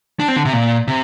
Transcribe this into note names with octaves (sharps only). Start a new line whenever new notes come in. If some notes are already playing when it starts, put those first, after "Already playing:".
D4
C4
D3
C3
A#2
C3